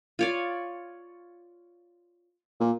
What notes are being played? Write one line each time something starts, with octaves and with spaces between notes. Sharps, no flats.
F4 C#5 D5
A#2